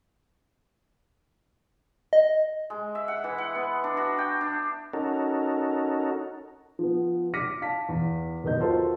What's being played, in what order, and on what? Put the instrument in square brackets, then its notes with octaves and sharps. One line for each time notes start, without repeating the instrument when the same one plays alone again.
[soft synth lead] D#5
[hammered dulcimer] G#3
E5
F#5
E3
F#5
B3
D4
F#4
G5
D4
[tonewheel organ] C#4 D#4 F#4 A4 A#4
[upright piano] F3 B3
D6 F6 A#6 B6 C#7 D#7
F5 A5 B6
E2
D#2 F#3 B3 D#5 G6
F4 F#4 A4 A#4 C5